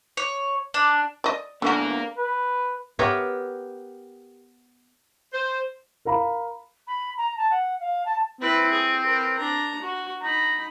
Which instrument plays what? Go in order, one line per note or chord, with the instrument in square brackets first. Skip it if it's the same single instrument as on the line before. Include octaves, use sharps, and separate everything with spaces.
[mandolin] C#5
D4
[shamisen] D5 D#5
[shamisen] D3 F#4 [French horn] A#3 [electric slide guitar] B3 D4 G#4 [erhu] A#4
[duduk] B4
[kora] B3 G4 A#4 C#5
[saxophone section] C5
[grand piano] A#4 F5 A#5 B5
[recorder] B5
A#5
A5
F#5
F5
A5
[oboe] C4 [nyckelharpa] E4 B4
[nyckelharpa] G#4
A#4 B4
D4 A#5
F#4
[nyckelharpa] D#4 B5 [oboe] A#5